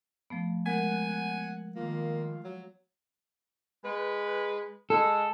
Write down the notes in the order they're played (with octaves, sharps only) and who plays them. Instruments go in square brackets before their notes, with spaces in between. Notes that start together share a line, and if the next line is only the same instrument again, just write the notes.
[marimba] F3 A3 B3
[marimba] G#3 A#4 [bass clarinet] B3 [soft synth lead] F#5 [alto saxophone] G#5
[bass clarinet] D#3 [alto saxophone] A#3 [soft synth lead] F4
[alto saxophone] F#3
[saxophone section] G#3 B4
[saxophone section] G#3 [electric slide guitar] A4